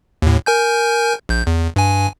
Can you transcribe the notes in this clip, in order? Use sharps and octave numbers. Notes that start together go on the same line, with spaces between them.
D#2 A2
A#4 G#5 G6
A#1 G6
E2
G2 G#5